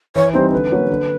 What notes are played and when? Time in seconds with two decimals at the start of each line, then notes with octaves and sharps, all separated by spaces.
0.16 E3 C#5
0.33 G3 C4 D#4 C5
0.52 D3 B4
0.71 F#3 A#3 C#4 F#4
0.90 D3